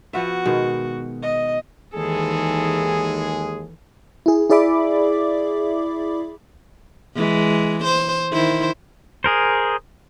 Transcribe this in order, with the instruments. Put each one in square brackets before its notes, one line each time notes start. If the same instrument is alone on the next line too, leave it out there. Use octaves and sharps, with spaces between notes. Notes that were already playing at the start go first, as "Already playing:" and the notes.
[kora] F3 B3 E5 [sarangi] F#4
[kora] B2 D#3 G#3
[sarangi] D#5
[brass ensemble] D#2 G#3 G#4 [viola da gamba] D#3 E3 A4
[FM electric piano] E4 G#4
E4 G#4 D5 E5 B5 D6
[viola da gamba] E3 G#3
C5
D#3 E4 C5
[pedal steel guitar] G#4 A#4 C5